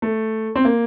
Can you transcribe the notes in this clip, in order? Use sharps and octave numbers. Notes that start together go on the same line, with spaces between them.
A3
C4
A#3